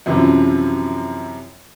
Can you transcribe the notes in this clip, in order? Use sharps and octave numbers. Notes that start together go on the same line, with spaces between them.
F#2 C3 E3 F3